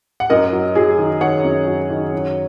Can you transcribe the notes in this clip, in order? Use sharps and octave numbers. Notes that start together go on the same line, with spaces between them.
F#5
F#2 A#4 D#5
F#3
F#3 G#4
D#3
D#3 C#5 F#5
F#2
F#3
D#3
F#2